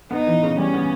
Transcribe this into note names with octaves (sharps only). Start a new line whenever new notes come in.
B3 D#4
E3
C#3
G3 C#4
B3